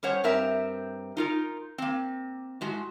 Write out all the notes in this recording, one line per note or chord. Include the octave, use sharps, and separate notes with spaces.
G3 C#4 C5 C#5 F#5
G2 C4 A#4 E5 A#5
D#4 F4 A#4
A#3 C4
A2 G#3 F#4